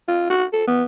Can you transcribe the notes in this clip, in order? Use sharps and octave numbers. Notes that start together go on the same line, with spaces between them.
F4
F#4
A4
B3